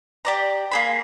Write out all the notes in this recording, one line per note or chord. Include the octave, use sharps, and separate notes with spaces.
G4 D5 A#5
A#3 G#4 B5